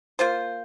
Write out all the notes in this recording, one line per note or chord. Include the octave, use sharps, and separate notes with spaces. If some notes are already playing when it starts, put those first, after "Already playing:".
A#3 F4 C5